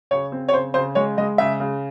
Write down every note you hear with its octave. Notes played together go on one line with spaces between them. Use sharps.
C#3 C#5
C4
C#5
C#3 C5
C#3 C5
G#3 C#5
G#3 D#5
C#3 E5
C#3